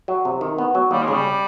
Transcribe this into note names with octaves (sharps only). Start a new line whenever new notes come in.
F#3
C3
D#3
B3
F#3
D#2 G3
G#3
C#3
G3